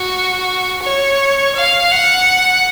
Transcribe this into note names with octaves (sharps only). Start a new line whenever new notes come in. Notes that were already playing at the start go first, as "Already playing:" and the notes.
Already playing: F#4
C#5
F5
F#5